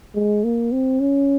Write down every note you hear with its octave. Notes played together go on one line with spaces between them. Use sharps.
G#3
A#3
C4
C#4